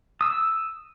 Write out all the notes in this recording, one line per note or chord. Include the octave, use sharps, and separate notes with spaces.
D#6 E6